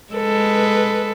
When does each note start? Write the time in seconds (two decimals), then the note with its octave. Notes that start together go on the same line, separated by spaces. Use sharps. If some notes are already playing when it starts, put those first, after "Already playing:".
0.13 G#3 A4 B4